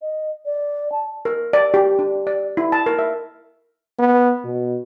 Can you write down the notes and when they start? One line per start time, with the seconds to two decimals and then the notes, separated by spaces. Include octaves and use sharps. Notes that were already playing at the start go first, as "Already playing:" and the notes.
0.02 D#5
0.46 D5
0.92 A5
1.25 A#4
1.53 D5
1.74 G4
1.99 D4
2.27 D5
2.57 E4
2.72 A5
2.86 A#4
2.99 E5
3.99 B3
4.45 B2